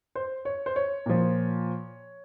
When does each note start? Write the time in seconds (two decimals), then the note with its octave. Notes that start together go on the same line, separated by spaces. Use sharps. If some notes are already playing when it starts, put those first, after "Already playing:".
0.15 C5
0.45 C#5
0.66 C5
0.76 C#5
1.06 A#2 F3